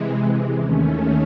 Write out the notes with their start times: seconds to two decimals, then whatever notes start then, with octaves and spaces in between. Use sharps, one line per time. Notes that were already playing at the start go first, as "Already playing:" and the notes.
Already playing: C3 E3 G#3
0.57 D#2 D#3 A3 C#4